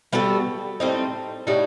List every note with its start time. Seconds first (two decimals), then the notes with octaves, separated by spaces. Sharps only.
0.13 G3 B3 F#4 A4
0.80 A2 G3 C4 D#4
1.47 A2 G3 D#4 F#4